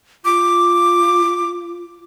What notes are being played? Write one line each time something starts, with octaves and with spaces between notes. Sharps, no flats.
F4 D6